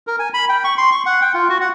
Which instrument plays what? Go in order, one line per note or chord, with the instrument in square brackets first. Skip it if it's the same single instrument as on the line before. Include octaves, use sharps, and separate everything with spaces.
[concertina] A#4
G#5
B5
G5
C#6
C6
C#6
F#5
G5
F4
F#4
F#5